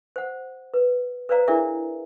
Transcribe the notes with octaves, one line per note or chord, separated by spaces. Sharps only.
C5 F#5
B4
B4 C5 D5 F5 A#5
D4 E4 G#4 A#4 D5 E5